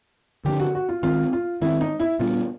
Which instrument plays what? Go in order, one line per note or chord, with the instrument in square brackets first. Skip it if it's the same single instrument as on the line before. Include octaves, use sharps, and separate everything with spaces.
[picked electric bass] D3 F3 A3 D4 [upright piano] G4
[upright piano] F#4
F#4
F4
[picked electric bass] D#3 G#3 C4 [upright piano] F4
[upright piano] F4
[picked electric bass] D#3 G#3 C4 [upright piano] E4
[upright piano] D#4
E4
[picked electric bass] A#2 G3 B3 D4 [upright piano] F4